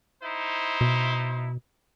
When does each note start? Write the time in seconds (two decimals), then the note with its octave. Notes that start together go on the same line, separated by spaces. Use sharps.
0.23 D#4 E4 C5
0.81 B2